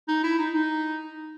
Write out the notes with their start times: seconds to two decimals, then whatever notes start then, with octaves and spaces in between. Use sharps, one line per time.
0.08 D#4
0.24 E4
0.39 D#4
0.54 D#4